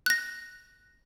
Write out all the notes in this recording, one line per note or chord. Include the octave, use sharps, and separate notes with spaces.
F#6 A#6